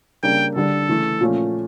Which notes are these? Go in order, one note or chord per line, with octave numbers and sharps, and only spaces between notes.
C#3 G3 A#3 D4 G5
D3 G3 D4 A4
C#3 E3 A3
A#2 F3 A3 C#4